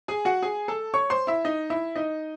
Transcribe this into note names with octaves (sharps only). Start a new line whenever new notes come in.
G#4 G#5
F#4 F#5
G#4 G#5
A4 A5
C#5 C#6
C5 C6
E4 E5
D#4 D#5
E4 E5
D#4 D#5